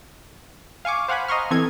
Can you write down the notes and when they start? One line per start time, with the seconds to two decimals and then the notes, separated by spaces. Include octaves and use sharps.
0.85 F5 G#5 C#6 D6
1.08 C5 F5 F#5 G#5 B5
1.28 D#5 A#5 C6 C#6 F6
1.51 E3 C4 A4 D#5 G#6